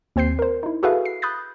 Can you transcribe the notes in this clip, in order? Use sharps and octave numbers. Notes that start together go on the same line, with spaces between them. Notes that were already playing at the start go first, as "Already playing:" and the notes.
D#2 C4 C5 G6 C7
A#4 C5
D#4 E4
F#4 G#4 A4 B4 E5 F5
C7
B5 D#6 F#6 G6 A6